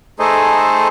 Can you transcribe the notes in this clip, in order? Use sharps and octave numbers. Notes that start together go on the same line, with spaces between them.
A3 D#4 G#4 A4 C5 D#5